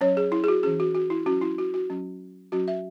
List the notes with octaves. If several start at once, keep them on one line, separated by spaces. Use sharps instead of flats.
F#3 C#4 C#5
G#4
E4
G#4
F#4
E3 C#4 G#4
F#4
F#4
E4
F#3 C#4 F#4
E4
F#4
F#4
F#3 C#4
F#3 C#4 F#4
E5